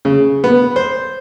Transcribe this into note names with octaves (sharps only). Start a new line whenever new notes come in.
C#3
B3
C5